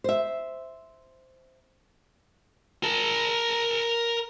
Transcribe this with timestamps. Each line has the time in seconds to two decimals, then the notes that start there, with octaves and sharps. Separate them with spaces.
0.04 C5 E5
2.83 A#4 A5